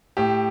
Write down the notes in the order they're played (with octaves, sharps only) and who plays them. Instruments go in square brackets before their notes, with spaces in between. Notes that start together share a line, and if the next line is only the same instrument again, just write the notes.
[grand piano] A2 G4